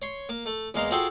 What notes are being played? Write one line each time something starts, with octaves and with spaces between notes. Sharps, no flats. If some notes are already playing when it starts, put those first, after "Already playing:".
C#5 C6
A#3
A3
E2 G#3 A#3 F5 A#5 C6
F4 F#4 G#4 A4 C5 G5